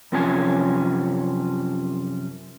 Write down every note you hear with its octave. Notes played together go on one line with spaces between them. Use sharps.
F#2 C3 F3 C#4 G4 G#5